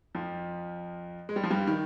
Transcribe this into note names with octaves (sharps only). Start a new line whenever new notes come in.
F2 F3
G#3
G3
F3
G2 G3
D#3